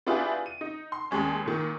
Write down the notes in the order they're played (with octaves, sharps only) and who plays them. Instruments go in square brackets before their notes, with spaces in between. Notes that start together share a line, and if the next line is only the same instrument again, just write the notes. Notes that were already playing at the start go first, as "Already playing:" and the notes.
[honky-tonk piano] B3 D4 E4 F4 G4 G#4
D#7
D#4
C6
D#2 G3 G#3 C#4
A#2 D#3